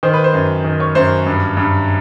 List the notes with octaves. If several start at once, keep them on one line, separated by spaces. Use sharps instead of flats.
D#3 C5
B4
C5
F#2
D#3
C#5
F#2 C5
G2
G2